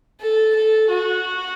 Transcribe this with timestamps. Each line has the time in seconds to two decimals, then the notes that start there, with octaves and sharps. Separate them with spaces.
0.20 A4
0.54 A4
0.89 F#4